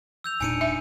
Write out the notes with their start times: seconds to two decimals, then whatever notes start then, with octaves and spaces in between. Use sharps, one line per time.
0.24 E6 G6 F7
0.41 E1 A#2 D4 D#4 G#5 C#7 D#7
0.61 E5